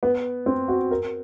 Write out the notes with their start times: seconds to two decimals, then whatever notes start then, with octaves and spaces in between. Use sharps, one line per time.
0.03 B3
0.46 C4
0.68 F#4
0.91 A#4